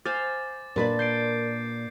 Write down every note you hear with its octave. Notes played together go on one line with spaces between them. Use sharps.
C5 F5 G#5 D6 A6
A#2 D4 A#4 B4 D5
C6 G6 C7 D7